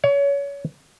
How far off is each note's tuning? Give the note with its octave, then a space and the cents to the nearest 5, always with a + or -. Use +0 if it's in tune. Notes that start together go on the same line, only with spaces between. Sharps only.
C#5 +25